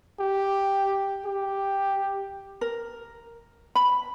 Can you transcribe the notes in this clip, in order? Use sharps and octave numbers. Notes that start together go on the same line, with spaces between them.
G4
G4
A#4
B5